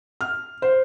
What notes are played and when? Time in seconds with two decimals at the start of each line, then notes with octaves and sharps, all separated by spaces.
0.21 F6
0.62 C5